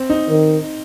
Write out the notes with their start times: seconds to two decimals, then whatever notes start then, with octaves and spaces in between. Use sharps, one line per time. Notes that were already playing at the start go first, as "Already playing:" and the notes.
Already playing: C4
0.10 D#4
0.30 D#3